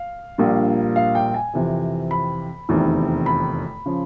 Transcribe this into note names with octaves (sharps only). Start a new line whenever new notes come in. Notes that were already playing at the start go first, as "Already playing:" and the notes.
Already playing: F5
A#1 A#2 G3 A#3 D4
F5
G5
G#5
F2 C3 E3
B5
F1 E2 C3 D#3
B5
C#3 F3